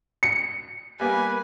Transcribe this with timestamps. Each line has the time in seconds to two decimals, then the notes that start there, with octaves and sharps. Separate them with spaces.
0.23 C#7
1.00 G3 A#3 B3 B4 G#5